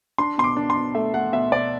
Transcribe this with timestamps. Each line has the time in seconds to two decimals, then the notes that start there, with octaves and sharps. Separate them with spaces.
0.18 D4 C6
0.38 B2 C6
0.44 D6
0.57 D4
0.70 C6
0.76 B2
0.95 A3 E5
1.14 A3 F#5
1.33 B2 E5
1.52 B2 D5